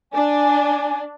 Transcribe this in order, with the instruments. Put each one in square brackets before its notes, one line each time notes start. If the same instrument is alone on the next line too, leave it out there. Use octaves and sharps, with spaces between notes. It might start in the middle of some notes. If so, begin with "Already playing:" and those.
[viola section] D4 [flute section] G#5